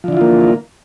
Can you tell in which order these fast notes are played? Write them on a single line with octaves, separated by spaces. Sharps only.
F3 D3 E3 F4 A#3